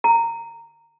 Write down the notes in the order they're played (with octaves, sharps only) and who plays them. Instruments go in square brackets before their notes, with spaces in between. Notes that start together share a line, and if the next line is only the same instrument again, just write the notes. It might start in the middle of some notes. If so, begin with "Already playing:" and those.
[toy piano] A#5